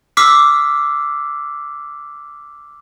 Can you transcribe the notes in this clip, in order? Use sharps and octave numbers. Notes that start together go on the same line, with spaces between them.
D6 E6 F6 B6 C7